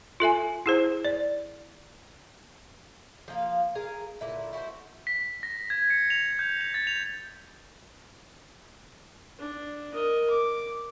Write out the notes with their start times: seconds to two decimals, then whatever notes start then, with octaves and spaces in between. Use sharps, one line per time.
0.20 F4 A4 E5 G#5
0.66 E4 G#4 C5
1.05 D5
3.28 F3 A#3 F5
3.75 G#4 A#4 F5 A#5
4.21 A#2 D3 E4
4.53 E4 F#4 G#4 C5
5.07 B6
5.43 A#6
5.70 G#6
5.90 C#7
6.10 F7
6.39 G6
6.61 F7
6.74 A6
6.87 F7
9.39 D4
9.93 A#4 D#5
10.30 D6